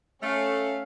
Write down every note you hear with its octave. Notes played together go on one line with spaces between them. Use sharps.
A3 C#4 F5